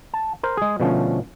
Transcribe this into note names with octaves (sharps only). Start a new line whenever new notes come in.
A5
A#4 C5
G#3 G#4
B2 D3 F3 A3 C#4